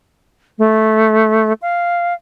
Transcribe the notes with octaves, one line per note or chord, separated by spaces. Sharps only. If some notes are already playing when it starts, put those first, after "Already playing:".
A3
F5